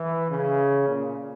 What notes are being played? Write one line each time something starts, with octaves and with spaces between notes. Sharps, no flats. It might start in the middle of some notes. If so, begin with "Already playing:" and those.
Already playing: E3
C#3
A#2